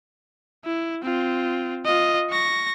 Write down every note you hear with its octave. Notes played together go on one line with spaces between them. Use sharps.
E4
C4 F4
F4 D#5
C#6 A#6